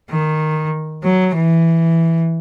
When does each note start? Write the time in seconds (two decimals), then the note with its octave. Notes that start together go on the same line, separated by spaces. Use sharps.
0.11 D#3
1.03 F#3
1.36 E3